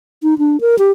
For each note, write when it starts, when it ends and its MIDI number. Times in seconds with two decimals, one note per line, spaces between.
0.23 0.38 63
0.38 0.60 62
0.61 0.78 70
0.79 0.91 67